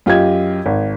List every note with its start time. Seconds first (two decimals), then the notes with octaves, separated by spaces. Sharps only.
0.06 F#2 F4 G4 D#5 G#6
0.66 G#1